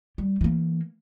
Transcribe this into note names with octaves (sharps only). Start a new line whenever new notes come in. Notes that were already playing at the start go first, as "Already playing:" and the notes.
G3
E3 A#3